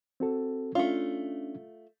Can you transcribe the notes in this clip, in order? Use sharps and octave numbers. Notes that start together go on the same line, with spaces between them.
C4 F#4 A4
A3 C#4 D4 F4